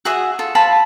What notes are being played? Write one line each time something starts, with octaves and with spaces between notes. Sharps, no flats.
F#4 G#4 E5 F#5
F4 A4
C5 F5 A5 B5